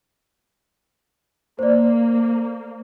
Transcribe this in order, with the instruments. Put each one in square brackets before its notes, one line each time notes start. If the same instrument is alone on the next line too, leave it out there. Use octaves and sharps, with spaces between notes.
[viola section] A#3 [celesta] C5 D5